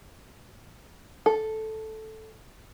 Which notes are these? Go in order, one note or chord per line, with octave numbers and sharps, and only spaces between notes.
A4